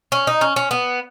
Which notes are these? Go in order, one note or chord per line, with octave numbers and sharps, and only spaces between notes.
C#4
D#4
C#4
C#4
B3